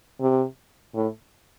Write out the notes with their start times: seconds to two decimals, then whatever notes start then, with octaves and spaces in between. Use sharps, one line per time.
0.20 C3
0.95 A2